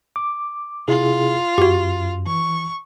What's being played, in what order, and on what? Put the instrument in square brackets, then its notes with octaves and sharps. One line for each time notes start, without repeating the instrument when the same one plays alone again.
[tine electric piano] D6
[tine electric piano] C3 E4 G#4 [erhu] F4
[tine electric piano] F#2 [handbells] F#4 G4
[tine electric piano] E3 [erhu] C#6